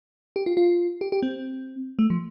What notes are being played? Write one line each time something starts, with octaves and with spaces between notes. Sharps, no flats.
G4
F4
F4
G4
G4
C4
A3
F3